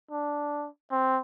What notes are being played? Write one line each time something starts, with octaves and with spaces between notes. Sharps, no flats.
D4
C4